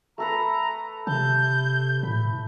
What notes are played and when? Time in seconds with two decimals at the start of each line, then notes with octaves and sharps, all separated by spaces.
0.18 A3 A4 B4 A#5
1.07 C3 A5 G6
2.03 A2 B5